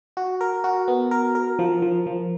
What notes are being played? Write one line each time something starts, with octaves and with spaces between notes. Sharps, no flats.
F#4
A#4
F#4
B3
A#4
A#4
F3
F3
F3